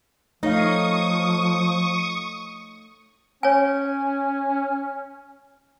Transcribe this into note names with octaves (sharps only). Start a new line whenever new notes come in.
F3 A3 D#4 C#5 F5 C#6 D#6
C#4 C#5 G#5